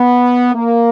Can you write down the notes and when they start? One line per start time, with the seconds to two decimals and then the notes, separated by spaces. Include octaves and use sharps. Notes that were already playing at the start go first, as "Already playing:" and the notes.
Already playing: B3
0.55 A#3